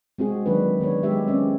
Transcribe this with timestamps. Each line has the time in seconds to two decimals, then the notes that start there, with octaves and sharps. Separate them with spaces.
0.18 G#3 C4 F#4 G#4
0.46 D#3 F#3 G#3 A#3 D4 B4
0.80 D#3 B3 D4 C#5
1.03 G#3 G4 E5
1.28 C4 C#4 D5